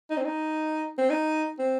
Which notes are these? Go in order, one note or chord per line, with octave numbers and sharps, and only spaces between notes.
D#4
C4
D#4
C4
D#4
C4